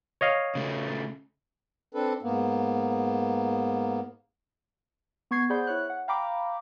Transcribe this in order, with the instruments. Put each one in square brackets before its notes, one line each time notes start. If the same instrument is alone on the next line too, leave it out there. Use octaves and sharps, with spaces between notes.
[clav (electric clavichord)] C#5 D#5 F5
[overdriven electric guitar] C#3 A3
[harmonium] C4 D4 A4 B4
G#2 A#3 B3
[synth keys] B3 C#6 G#6 C7
G#4 C5 D5 F#5 B5 G6
E4 C#5 F#6
F#5
F5 G5 A#5 B5 D6